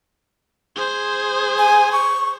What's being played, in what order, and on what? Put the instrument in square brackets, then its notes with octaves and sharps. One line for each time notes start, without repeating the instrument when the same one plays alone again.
[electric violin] G#4 C5
[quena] G#5
C#6